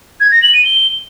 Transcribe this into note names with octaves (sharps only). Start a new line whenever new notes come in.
G#6
A#6
F#7
D#7
G7